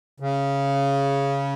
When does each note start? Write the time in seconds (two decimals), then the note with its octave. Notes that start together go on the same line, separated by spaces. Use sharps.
0.20 C#3